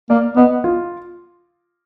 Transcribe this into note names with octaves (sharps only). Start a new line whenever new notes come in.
A#3 D5
B3 D#5
F4